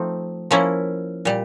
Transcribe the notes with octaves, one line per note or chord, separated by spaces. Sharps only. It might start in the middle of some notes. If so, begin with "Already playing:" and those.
Already playing: F3 A3 C4 D#4
F3 A#3 C#4 E4
A#2 G3